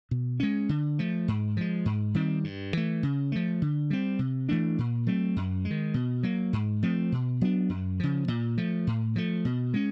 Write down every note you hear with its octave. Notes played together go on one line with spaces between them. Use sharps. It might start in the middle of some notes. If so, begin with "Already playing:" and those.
B2
G#3 C#4
D3
F3 A3
G#2
F3 G#3
G#2
D#3 G3 C4
G2
E3 A3
C#3
F3 A3
D3
G3 C4
C3
E3 A3 D4
A#2
F#3 A3 C4
F#2
G#3
D#3
B2
F#3 A#3
G#2
F3 A3 C4
B2
F#3 B3 D4
F#2
C#3 F3
A#2
F3 A3
A2
F3 A3
B2
G#3 C#4